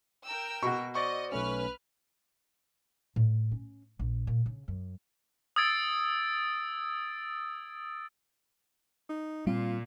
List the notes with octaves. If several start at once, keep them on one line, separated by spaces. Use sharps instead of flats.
A#4 G5 E6
B2 F#4 C#6
C5 D5 D#5 C#6 D6
B1 A3 C#4 B4 F6
A2
C#4
A#1
A#2
C#3
F#2
D#6 E6 G#6 A6 D7
D#4
A#2 G3 C4 F4